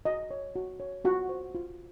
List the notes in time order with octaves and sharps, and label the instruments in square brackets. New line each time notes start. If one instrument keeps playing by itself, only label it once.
[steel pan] F#4 D#5
C#5
F#4
C#5
F4 F#4 F#5
C5
F4